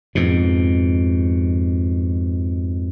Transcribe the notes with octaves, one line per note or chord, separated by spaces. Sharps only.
F2 G#2 B2